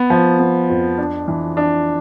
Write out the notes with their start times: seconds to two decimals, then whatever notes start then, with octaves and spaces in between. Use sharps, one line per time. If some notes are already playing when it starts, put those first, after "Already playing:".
Already playing: B3
0.10 F3
0.39 B3
0.70 F2
0.98 D4
1.28 E3
1.57 D4